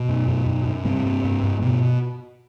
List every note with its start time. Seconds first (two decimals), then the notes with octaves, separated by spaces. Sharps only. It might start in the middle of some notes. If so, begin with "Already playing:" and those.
Already playing: B2 B3
0.09 F#2
0.28 F#2
0.46 F#2
0.65 F#2
0.85 G2 C3 C4
1.05 G2
1.24 G2
1.43 G2
1.61 G2 B2 B3